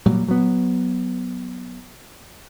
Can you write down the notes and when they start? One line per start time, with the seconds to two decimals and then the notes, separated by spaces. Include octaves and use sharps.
0.06 A#2 F#3 G3
0.28 F#3 B3